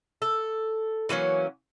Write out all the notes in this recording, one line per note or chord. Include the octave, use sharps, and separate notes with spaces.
A4
E3 F#3 A#3 C#4